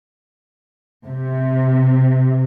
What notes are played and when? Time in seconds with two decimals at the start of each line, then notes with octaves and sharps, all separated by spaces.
1.07 C3